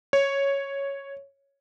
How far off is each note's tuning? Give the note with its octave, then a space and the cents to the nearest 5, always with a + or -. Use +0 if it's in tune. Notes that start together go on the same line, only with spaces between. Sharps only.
C#5 +0